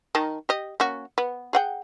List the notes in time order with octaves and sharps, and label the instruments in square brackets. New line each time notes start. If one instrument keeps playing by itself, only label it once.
[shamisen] D#3 D#4 A5
G4 D#5
A#3 C#4 F#4
B3
G#4 F#5 G5